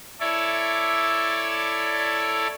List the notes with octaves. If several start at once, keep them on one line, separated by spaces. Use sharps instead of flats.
E4 A4 C#5 D5 E5